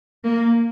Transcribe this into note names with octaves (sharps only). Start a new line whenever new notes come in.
A#3